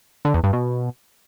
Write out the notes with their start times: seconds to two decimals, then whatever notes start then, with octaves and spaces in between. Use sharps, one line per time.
0.25 D3
0.34 E2
0.44 G2
0.53 B2